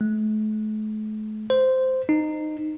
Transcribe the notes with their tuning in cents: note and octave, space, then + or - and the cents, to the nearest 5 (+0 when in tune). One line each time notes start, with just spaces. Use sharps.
A3 -40
C5 -10
D#4 -15